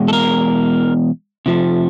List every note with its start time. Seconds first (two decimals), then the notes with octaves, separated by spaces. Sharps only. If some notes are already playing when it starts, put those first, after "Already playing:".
Already playing: E2 B2 G#3
0.08 A4
0.13 A#4
1.46 C3 F3 A3